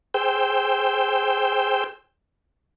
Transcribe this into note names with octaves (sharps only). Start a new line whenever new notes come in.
G#4 C5 G5 E6